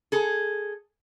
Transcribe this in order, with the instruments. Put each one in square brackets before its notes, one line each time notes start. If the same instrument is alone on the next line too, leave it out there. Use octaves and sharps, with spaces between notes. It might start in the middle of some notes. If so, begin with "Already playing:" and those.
[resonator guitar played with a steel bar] G#4 A4